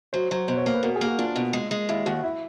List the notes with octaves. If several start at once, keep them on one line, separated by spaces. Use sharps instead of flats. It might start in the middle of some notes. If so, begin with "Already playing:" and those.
F#3 C5
F#3 C5
B2 C5
C#5
A#3 C5
B4
B2 A#4
G#4
A#3
F#4
D4 F4
B2
G#3
G#3
D#2 E4
D#2 F#4
E4